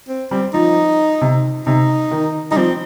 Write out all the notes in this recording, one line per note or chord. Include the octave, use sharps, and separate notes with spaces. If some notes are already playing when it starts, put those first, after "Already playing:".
C4
G3 C4
F3 D#4
C3
C3 D#4
D#3
G3 D#4
F3 C4